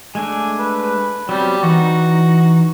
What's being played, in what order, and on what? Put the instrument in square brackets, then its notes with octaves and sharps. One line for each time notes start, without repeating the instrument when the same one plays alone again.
[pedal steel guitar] G#3 A3 D4 [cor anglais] G#5
[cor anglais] B4
[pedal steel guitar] F#3 B3 C4 [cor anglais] G3
[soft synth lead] E3 [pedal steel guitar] D#4 [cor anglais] F#4